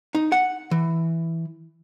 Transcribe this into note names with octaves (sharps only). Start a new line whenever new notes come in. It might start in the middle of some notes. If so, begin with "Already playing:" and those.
D#4
F#5
E3